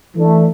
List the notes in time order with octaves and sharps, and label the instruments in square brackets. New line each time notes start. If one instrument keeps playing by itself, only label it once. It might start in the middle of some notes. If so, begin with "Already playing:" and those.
[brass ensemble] E3 A3 D4